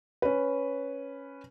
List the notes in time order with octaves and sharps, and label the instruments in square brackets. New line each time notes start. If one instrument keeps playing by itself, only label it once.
[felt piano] C#4 B4